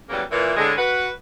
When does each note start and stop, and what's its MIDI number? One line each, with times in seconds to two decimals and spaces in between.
0.09 0.22 49
0.09 0.22 52
0.09 0.22 54
0.09 0.22 55
0.09 0.22 58
0.09 0.22 59
0.31 0.56 46
0.31 0.56 52
0.56 0.72 45
0.56 0.72 50
0.56 0.72 56
0.77 1.08 66
0.77 1.08 71